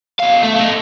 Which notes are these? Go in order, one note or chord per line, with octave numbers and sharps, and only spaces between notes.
B2 F5
A3
A3 D#5